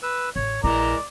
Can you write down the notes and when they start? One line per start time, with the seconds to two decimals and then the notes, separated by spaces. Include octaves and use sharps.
0.03 B4 E6
0.36 A1 C#5
0.64 A#1 E3 G#3 A#4 D5 A#5